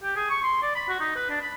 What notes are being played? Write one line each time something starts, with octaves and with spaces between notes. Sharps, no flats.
G4
G#4
C#6
C6
D5
B5
F#4
D#4
B4
D4
B5